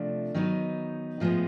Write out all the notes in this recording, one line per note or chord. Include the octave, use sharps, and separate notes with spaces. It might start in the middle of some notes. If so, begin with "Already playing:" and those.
Already playing: C3 F3 A3 D4
D#3 F#3 B3 D#4
A2 F3 G#3 B3